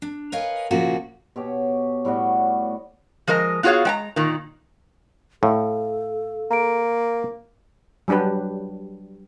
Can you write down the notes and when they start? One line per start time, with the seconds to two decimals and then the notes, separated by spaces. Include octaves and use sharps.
0.02 D4
0.32 A#4 B4 C#5 D#5 F5 G#5
0.71 A#2 C#3 F3 A#3 C#4 F#4
1.36 B2 G4 C#5
2.05 A2 G3 B3 F#4
3.27 F3 G#3 A#4 D#5
3.63 B3 F4 F#4 G#4 C#5 F5
3.85 G#3 G5 A#5
4.16 A#2 D#3
5.43 A2 A4 F5
6.51 A#3 A#5 D7
8.08 F#3 G3 D4 G4 B4